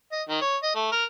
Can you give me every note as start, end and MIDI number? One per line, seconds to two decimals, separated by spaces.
0.12 0.22 75
0.28 0.38 51
0.41 0.57 73
0.63 0.73 75
0.75 0.88 57
0.92 1.04 70